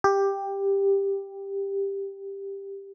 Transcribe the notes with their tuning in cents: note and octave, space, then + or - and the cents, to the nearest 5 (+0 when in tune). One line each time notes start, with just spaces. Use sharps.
G4 +10